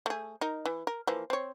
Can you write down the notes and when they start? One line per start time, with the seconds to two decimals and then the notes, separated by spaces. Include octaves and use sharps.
0.06 A3 G#4
0.41 D#4 A#4
0.65 E3
0.87 A#4
1.07 E3 F3 A#3
1.30 C4 C#5